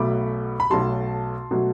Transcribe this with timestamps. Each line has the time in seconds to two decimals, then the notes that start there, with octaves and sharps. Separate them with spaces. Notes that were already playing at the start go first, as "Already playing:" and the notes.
Already playing: B1 B2 F#3 A3 B5 D6
0.60 B5
0.70 B1 B2 F#3 A3 A5 C6
1.51 B2 F#3 A3